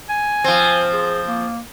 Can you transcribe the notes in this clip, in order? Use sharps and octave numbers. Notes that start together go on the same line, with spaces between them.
G#5
F3 C4
G#4
A#3